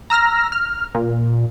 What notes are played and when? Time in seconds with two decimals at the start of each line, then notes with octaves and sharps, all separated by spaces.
0.10 A#5 E6 F6 A#6
0.52 F6
0.95 A#2